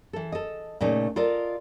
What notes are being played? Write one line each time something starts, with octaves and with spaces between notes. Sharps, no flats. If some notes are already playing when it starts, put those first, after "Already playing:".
E3 A4
A4 D#5
A#2 C#3 A3 D#4
F4 A4 A#4 D5 D#5